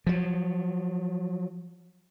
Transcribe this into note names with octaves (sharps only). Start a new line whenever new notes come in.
F3 F#3